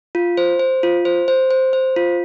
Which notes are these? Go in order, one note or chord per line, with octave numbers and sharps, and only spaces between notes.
F4
C5
C5
F4
C5
C5
C5
C5
F4